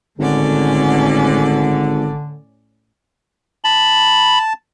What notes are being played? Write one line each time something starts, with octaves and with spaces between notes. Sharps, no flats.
G#1 A2 D3 C#4 D5
A5 B5